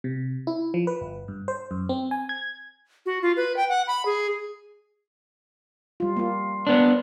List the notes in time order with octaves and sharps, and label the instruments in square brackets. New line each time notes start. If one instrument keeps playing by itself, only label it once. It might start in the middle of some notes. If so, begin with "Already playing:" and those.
[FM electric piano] C3
E4
F3
B4
G1
G2
C5
F#2
C4
G#5
G#6
[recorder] F#4
F4
B4
G5
F#5
B5
G#4
[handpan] G3 F4
A#3 F4
[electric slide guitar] B3 D4